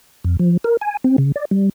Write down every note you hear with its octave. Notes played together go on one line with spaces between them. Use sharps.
F2
F3
A#4
G#5
C4
C#3
D5
G3